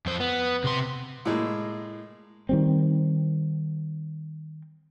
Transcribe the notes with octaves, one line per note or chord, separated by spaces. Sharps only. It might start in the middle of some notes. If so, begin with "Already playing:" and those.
F2 C5
B3
C3 C6
A2 G#3 A#3
D#3 G3 C4